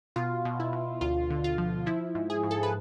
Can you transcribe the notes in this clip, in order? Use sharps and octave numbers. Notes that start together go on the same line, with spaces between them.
B2 F4
B2
E4
B2
D2 F4
D3
F4
F3
F3 E4
G#2
G#4
G#2
A4
B4